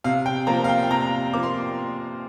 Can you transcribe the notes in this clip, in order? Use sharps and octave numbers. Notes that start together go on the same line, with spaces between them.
C3 F5
G5
F3 A#3 A#5
F5
G5
G5
C3 A#5
F3 A#3 D6
C6